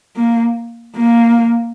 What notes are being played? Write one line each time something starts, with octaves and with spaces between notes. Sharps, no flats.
A#3
A#3